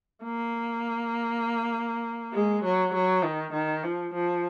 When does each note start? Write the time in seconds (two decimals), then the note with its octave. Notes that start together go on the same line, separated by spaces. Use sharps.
0.24 A#3
2.33 G#3
2.64 F#3
2.94 F#3
3.24 D#3
3.54 D#3
3.84 F3
4.14 F3